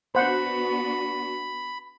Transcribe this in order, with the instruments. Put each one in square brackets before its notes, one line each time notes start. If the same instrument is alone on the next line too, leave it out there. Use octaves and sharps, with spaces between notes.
[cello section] B3 D4 F#4 [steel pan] C5 F#5 [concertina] B5